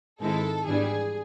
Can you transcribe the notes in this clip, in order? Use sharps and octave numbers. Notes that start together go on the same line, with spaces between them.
G#2 D#3 G#3 C4 E4 A4
G#2 E3 G3 B3 D4 G#4